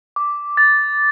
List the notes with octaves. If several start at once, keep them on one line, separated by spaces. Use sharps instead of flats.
D6
A6